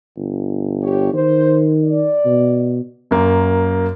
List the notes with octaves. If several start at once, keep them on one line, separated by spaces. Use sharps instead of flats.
G1
G4 C#5
D#3 C5
D5
B2
F#2 A#3